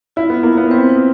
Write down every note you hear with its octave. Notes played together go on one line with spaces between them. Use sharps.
E4 F4
B3 F4
A#3
B3 F4
C4 B4
D#4